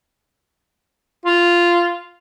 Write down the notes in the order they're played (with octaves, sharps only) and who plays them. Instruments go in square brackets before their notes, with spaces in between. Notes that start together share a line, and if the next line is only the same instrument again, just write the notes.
[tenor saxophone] F4